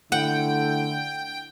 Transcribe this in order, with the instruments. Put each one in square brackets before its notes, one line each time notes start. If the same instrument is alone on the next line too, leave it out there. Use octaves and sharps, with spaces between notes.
[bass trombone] D3 [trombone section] A3 E4 [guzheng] F#5 [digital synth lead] G5